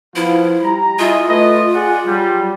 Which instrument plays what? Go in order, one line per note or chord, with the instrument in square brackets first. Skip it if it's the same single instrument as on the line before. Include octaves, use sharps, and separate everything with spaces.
[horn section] F3 B3 F4 [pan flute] E4
[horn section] G3 A#5
[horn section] E4 G#4 D#5 [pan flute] F4
[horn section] A3 B4 D#5
G#4 D5 F#5
F#3 G3